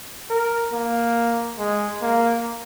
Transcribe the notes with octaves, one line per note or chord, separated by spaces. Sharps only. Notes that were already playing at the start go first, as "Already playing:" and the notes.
A#4
A#3
G#3
A#3